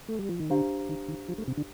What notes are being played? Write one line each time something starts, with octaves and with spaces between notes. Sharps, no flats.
A3
G3
F3
D#3
D3 D4 G4 C5 F5 A#5
D#3
D#3
F3
A3
C3
D3